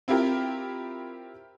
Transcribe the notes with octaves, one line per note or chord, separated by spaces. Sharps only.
C4 E4 F4 G4 A#4